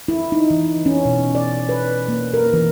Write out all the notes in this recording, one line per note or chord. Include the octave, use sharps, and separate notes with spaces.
E4
D#4
E3
C#4
B2
D5
B4
A#3
A#4
E3